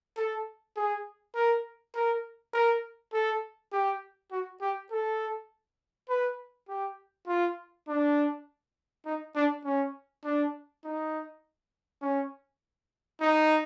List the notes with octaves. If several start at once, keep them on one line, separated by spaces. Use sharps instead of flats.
A4
G#4
A#4
A#4
A#4
A4
G4
F#4
G4
A4
B4
G4
F4
D4
D#4
D4
C#4
D4
D#4
C#4
D#4